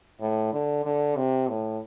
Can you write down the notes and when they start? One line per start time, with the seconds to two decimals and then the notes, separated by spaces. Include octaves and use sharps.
0.21 A2
0.53 D3
0.85 D3
1.17 C3
1.49 A2